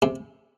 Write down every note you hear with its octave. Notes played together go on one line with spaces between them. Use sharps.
C3